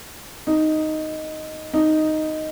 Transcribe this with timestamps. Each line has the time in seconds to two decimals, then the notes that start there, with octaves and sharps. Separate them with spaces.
0.47 D#4
1.74 D#4